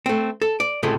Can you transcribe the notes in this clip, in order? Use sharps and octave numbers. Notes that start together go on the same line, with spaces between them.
A3 C4
A4
D5
C#2 A2 C3 G#3 A3